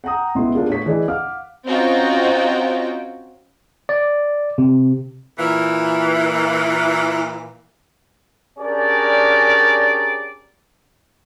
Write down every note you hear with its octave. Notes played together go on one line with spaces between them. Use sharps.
F#5 G5 A#5 D#6
C#2 B2 B3 E4 C6
B3 D4 F4 G4 G#4 A#4
A2 C#5 B6
E3 G#4 D5 D#5
F5 F#5 D6 F6
C4 C#4 D#4 F4 F#4 G5
D5
C3
A#2 E3
C#4 D4 G4 G#4 A#4 D5